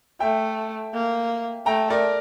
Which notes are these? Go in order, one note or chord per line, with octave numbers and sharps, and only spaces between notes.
A3 E5 G5
A#3
A3 G5 A#5
A#4 D5